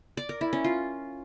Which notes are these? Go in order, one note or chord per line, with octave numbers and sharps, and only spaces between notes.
D5
A#4
E4
C#4
F4